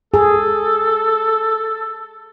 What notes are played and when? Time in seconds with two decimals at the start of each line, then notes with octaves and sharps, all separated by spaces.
0.14 G#4 A4